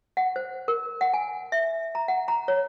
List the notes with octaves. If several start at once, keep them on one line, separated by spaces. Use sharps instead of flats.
F#5
C5
A#4
F#5
G#5
E5
A#5
F#5
A#5
C#5